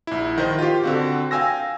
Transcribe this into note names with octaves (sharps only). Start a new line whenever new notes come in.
A#1 E4
D#3 C5 D#5
F4 G4
D3 C4 F#4
F5 G5 G#5 E6 A#6